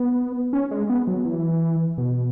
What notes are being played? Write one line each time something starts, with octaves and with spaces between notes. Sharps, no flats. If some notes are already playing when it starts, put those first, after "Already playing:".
Already playing: B3
C#4
G#3
B3
F#3
E3
B2